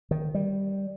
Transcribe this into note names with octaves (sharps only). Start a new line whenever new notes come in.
D#3
G3